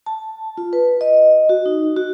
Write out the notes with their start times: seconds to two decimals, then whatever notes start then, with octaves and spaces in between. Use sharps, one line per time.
0.06 A5
0.58 F4
0.73 B4
1.01 D#5
1.49 F#4
1.66 D#4
1.96 F#4